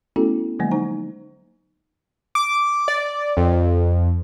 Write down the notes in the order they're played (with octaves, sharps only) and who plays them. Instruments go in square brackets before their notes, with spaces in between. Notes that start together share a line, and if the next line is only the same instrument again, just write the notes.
[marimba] A3 B3 C#4 E4 F#4 A4
D3 F3 F#3 G#3 A#3
D#4 C5 A#5
[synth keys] D6
D5
F2